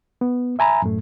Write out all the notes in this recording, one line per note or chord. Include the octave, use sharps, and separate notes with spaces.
B3
E5 G#5 A#5 B5
F#2 A2 A3